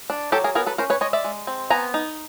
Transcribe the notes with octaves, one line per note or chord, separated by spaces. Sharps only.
D4
F#3 G4 A4
G#4 A#4
B3 G#4 A#4
A4 B4
C#4 A#4 C5
B4 C#5
G#3 C#5 D#5
D5 E5
G#3
C4
B3 G#5 A#5
D#4